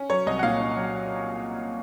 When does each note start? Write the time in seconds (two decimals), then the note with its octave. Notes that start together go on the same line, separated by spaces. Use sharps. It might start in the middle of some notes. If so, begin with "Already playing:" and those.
Already playing: C#4
0.10 F#3 C#5
0.27 C2 D#5
0.39 F#5
0.43 A#2 F5
0.60 C#4
0.76 F#3